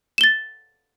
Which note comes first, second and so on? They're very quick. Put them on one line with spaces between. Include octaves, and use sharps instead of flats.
E7 G7 A6